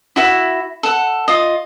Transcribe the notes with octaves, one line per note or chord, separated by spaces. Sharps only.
E4 F#4 E5 B5
A4 F#5
F4 D#5